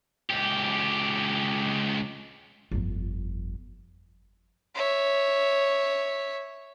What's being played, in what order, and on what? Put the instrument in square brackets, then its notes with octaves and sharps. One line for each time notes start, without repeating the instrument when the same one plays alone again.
[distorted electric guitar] C#2 G4
[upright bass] G1 F2
[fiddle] C#5 E5